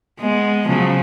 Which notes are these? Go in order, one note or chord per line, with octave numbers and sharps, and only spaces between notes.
G#3 B3
C#3 F3 F#3